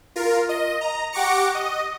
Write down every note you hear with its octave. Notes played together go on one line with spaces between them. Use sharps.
F4 A#4
D#5
A#5
G4 F#5 C#6 D6 A#6 C#7
D#5